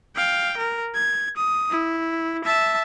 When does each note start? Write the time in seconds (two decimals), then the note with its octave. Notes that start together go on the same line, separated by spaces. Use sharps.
0.16 F5 G5
0.58 A#4
0.95 G#6
1.37 D#6
1.71 E4
2.45 E5 A5